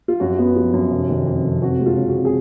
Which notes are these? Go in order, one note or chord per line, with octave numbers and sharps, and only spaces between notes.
F4
F#2 F#4
B3
F3
F#2
F1
D#3
F2
F1
F2 F#4
G#3
F4
C#3
F#4
F2
G#4